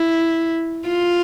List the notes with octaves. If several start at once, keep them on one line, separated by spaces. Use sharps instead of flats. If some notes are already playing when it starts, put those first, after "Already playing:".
Already playing: E4
F4